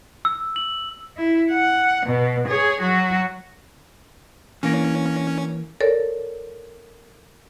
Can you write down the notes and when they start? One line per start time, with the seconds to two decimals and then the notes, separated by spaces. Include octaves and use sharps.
0.25 E6
0.56 F#7
1.17 E4
1.51 F#5
2.06 B2
2.48 G#4 C#5
2.81 F#3 F#4
4.63 E3 A#3 C#4
5.81 A4 A#4 C#5 D5